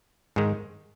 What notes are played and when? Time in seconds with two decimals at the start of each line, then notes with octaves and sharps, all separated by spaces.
0.36 G#2 D#3 G#3